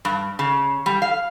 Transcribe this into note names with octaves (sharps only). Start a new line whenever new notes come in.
G2
C#3
G3
F5